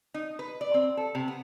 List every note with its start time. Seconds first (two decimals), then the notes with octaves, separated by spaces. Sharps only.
0.14 D#4
0.39 B4
0.61 D5
0.74 C4
0.97 A4
1.15 C3
1.28 B3